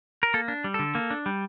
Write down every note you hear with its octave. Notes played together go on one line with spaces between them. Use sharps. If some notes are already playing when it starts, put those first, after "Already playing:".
A#4
A#3 A4
D4
G3
D3 A4
A#3
D4
G3